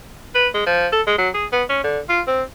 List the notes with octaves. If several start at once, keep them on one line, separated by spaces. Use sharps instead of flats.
B4
G#3
F3
A4
G#3
F#3
G#4
B3
C#4
D3
F4
C4